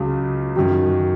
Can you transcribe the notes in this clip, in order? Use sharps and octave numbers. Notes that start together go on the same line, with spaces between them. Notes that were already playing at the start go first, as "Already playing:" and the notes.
Already playing: C#2 C#3 F#3
F#2 D#3 F#3